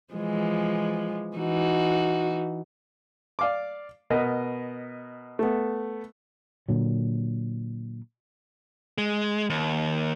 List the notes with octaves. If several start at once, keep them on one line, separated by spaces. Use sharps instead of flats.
E3 F3 G#3
E3 D#4 F#4
D5 F5 D6
B2 B3 A#4 D#5
A3 B3
A#2 D3 F#3
G#3
D#2